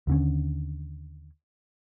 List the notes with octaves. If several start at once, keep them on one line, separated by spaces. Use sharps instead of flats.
D#2 D3 C#4